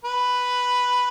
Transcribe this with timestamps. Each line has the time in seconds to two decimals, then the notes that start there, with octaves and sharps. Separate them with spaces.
0.05 B4